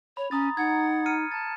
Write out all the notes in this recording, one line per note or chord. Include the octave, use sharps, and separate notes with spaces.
C#5 B5
C#4 A#5 D#6 A6
D#4 F#5 G#6
F6 C#7 D#7
A5 A6